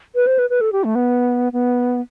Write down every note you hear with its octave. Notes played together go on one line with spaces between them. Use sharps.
B4
C5
B4
B4
A4
G4
A3
B3
B3